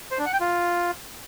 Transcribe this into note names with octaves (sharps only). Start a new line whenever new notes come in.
C5
D4
F#5
G5
F4